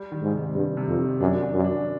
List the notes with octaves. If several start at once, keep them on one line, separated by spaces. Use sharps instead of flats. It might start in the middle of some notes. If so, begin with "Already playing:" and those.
Already playing: G3
D#3
G#2
C3
G2 G3
C3
F2
D#3
F#2 D4
D4
F#2
D4